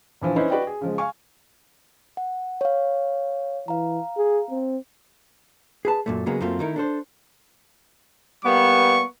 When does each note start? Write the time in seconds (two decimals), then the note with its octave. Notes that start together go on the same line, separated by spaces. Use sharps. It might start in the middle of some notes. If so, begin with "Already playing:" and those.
0.21 A#1 E3 F3
0.36 C#4 D#4 E4 B4 C5
0.50 F#4 B4 D5 D#5 G5
0.67 G#4
0.81 C#3 F3 G#3
0.98 F5 G#5 C#6
2.17 F#5
2.61 C#5 F5
3.68 E3 F5 A#5
4.18 G#4
4.51 C4
5.85 G#4 B4 A5
6.06 F#2 A#2 A3
6.26 C#3 F#3 G#3 A#3 B3
6.41 F#2 A3 A#3 C4 F4
6.59 D#3 A3 D#4 E4 A#4
6.76 D4 A4 C5
8.45 G3 A#3 B3 C#6